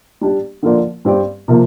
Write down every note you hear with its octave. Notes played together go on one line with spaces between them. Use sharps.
G3 D4 G4
D3 F3 A#3 F4 D5
G2 G3 C4 G4 D5
C3 F3 A#3